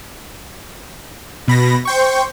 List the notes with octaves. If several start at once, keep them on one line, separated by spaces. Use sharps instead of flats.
B2 B5 A#6
C5 G5 C#6